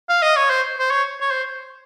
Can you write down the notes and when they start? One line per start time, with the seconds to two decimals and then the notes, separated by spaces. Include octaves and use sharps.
0.09 F5
0.22 D#5
0.36 C#5
0.50 C5
0.78 C5
0.91 C#5
1.21 C#5
1.31 C5